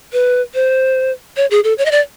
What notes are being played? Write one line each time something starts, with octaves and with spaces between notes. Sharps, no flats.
B4
C5
C#5
G#4
A4
C#5
D#5
D5